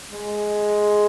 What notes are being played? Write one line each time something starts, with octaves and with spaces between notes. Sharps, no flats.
G#3